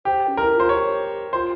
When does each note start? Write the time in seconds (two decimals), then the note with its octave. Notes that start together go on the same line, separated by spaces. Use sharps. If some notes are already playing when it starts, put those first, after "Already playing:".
0.05 G4 C5
0.28 C#4
0.37 E4 A#4
0.55 F4 C5
0.69 G4 C#5
1.33 F4 C5